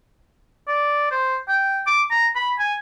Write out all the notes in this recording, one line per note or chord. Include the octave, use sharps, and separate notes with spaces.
D5
C5
G5
D6
A#5
B5
G#5